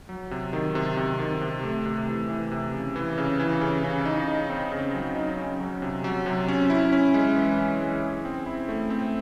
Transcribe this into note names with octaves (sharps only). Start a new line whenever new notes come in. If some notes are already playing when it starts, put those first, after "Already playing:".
F#3
C3
D#3
C3
C3
D#3
C3
A3
C3
E3
E3
C3
C#3
E3
C#3
E3
C#3
C#3
D#4
D#4
C4
C#3
F#3
D#4
C#4
F#3
C3
F#3
C3
C#4
E4
C#4
G#3
E3
E4
G#3
G#4
C4
E4
A3
C4